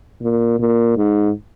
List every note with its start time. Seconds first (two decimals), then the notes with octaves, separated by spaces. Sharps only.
0.22 A#2
0.59 A#2
0.97 G#2